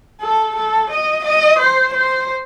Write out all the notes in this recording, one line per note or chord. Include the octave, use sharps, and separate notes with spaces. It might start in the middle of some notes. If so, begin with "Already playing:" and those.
A4
A4
D#5
D#5
C5
C5